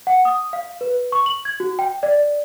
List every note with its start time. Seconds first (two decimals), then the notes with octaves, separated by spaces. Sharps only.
0.07 F#5
0.25 D#6
0.53 F5
0.81 B4
1.12 C#6
1.26 F#7
1.45 G#6
1.60 F#4
1.79 G5
2.03 D5